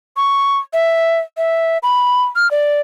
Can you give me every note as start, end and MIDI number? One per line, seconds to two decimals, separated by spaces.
0.17 0.58 85
0.73 1.20 76
1.37 1.78 76
1.83 2.24 83
2.36 2.50 89
2.51 2.81 74